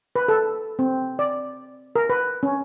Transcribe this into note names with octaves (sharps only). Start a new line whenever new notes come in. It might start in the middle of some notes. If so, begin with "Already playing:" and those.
B4
A4
C4
D5
A#4
B4
C#4